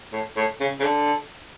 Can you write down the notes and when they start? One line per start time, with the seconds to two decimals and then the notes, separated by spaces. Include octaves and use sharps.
0.13 A2
0.37 A2
0.60 C#3
0.80 C#3
0.84 D3